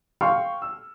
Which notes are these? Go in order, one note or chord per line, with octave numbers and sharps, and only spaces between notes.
F5 G5 C6 C#6 F6
E6